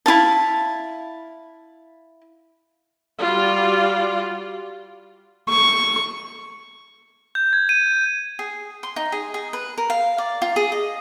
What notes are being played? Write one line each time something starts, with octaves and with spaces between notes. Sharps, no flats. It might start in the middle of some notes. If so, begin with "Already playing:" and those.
E4 F4 F5 A5
G3 F4 F#4 D5
C#6
G6
G#6
D#7
G#4
C6
D#4
G#4
G#4
B4
A#4
F5
D5
F4
G#4
D#5